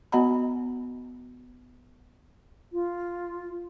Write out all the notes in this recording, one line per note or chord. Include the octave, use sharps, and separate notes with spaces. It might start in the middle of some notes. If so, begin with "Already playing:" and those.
B3 F#4 D#5 F#5 A#5 B5
F4